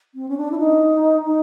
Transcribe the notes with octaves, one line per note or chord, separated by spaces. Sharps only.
C4
C#4
D4
E4
D#4
D#4